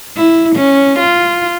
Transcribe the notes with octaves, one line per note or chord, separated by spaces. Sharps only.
E4
C#4
F4